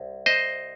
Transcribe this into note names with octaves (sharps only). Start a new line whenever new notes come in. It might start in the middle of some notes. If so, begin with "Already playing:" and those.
Already playing: C2
C5 D#5